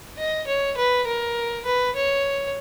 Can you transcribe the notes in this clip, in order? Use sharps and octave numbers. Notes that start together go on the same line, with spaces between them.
D#5
C#5
B4
A#4
B4
C#5